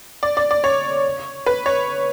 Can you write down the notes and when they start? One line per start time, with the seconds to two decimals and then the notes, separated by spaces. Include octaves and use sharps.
0.23 D5
0.37 D5
0.51 D5
0.64 C#5
1.46 B4
1.66 C#5